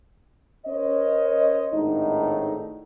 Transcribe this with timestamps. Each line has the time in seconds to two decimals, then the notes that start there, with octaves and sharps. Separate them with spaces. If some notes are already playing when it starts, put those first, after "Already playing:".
0.66 C#4 A#4 C5 C#5 D#5
1.73 G#1 A2 D4 D#4